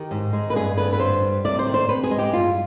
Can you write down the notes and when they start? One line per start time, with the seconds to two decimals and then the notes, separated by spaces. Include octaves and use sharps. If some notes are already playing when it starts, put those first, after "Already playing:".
Already playing: D#3 G4
0.11 G#2
0.33 G#3
0.50 B4
0.56 G2 G#4
0.77 D3 B4
0.93 B4
1.00 G2 C5
1.22 G3
1.45 C3 D5
1.59 C5
1.67 D#3
1.74 C5
1.88 C3 B4
2.04 G#4
2.11 G#3
2.19 G4
2.33 G2 F4